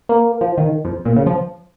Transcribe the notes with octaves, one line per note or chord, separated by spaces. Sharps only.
A#3
F3
D#3
F2
A#2
C#3
F3